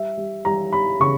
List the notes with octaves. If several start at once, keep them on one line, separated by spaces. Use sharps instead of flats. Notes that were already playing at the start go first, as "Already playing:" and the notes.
Already playing: G3 E5
G3
G3 A#5
G3 B5
C#3 C#6